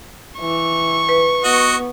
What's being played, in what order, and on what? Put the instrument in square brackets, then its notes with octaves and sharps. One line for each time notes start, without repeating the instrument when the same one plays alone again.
[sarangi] E3 [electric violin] C#6
[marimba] B4
[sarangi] B3 [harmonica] F#4 D#5